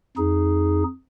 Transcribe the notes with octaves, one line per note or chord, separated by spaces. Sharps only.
F2 D#4 G#4